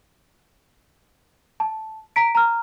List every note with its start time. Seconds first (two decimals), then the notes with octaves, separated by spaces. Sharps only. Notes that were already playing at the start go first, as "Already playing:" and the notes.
1.60 A5
2.16 A#5 B6 D7
2.35 A#5 F6